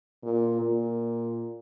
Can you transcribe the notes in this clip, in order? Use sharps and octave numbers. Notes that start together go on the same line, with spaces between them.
A#2
A#2